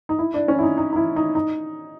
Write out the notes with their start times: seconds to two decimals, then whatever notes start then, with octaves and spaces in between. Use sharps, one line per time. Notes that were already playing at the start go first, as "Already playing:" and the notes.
0.09 D#4
0.19 E4
0.34 D4
0.48 C#4
0.59 E4
0.62 D#4
0.78 D#4
0.93 D#4
0.96 E4
1.16 D#4
1.35 D#4